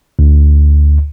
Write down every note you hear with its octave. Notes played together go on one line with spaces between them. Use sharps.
D2